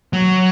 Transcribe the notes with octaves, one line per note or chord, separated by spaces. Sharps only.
F#3